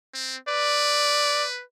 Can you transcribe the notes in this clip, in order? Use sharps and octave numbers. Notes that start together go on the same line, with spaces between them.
C4
B4 D5